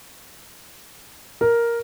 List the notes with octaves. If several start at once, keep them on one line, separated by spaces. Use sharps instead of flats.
A#4